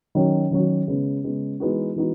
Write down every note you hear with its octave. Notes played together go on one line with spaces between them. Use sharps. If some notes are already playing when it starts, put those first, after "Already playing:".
D#3 F#3 C#4 F#4
D#3 F#3 C#4 F#4
C#3 G#3 B3
C#3 G#3 B3
E3 G#3 B3 D#4 F#4
E3 G#3 B3 D#4 F#4